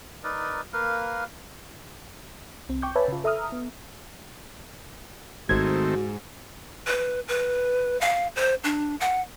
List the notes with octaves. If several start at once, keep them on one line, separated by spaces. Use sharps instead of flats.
D#4 A#4 B4 D5
A#3 A#4 B4 F5
C2 C4
G5 C#6 D6 G6
B4 C#5 E5 G#5 A5 B5
C#3 F4
A4 E5 A#5 D#6 F6
B3
G#1 G#2 D#3 A3 C4 F#4 G#6
B4
B4
F5
C5
D4
F#5